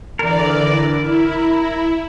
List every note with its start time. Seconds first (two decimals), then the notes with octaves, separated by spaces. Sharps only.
0.19 D3 E3 A#4 D5
1.00 E4